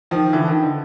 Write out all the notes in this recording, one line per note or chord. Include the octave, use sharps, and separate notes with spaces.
D#3 F3
D3 E3
D#3
D3